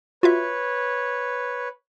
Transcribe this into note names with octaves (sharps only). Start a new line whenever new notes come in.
F4 F#4 B4 C#5 E5